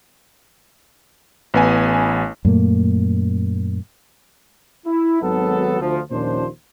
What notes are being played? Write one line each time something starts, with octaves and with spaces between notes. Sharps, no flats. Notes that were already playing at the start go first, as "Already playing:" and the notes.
A1 B3 G#5
F#2 A#2 A3 A#3
E4
G#1 F#3 B3 A4
D2 F3
D#2 A#2 F3 C#4 D4 C5